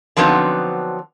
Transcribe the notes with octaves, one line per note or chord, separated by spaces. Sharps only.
D3 F3 F#3 B3 C4 D#4